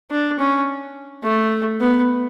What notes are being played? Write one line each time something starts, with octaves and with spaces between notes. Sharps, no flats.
D4
C#4
A3
B3